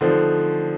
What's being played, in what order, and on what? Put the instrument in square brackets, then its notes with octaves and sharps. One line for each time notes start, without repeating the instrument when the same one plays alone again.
[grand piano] D3 F3 A3 C4 D#4